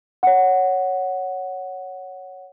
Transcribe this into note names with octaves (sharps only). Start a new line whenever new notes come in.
C#5 F#5